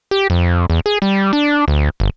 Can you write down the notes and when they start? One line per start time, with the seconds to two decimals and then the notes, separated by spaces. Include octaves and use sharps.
0.11 G4
0.30 F2
0.70 E2
0.86 G#4
1.02 G3
1.33 D4
1.68 D2
2.00 G1